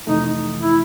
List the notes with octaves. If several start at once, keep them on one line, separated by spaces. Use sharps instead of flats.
F2 C3 E3 A3 D#4
E4